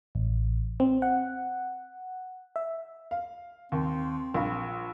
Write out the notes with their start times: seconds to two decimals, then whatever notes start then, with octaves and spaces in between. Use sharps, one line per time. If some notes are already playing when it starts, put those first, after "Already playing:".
0.15 A1
0.80 C4
1.02 F#5
2.56 E5
3.11 F5
3.72 D#2 C4
4.34 A#1 F5 B5